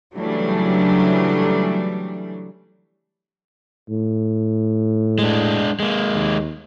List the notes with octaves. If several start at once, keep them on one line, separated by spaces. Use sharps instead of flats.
C#3 E3 F#3 G3 A3 D4
A2
G#3 D4
G#3 A#3
D#2